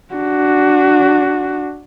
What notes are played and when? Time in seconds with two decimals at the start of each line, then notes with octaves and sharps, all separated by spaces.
0.15 D4 F#4